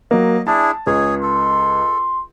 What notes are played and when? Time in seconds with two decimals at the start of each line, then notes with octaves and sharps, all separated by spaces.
0.11 F#3 A#3 D#5
0.47 D4 E4 G#4 A5
0.87 C#2 G#4 C#5
1.23 A4 C6